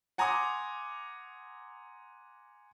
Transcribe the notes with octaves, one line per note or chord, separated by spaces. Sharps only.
F#5 G#5 A#5 C6 D6 D#6